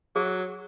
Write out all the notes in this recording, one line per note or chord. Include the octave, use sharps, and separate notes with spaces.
F#3 G#4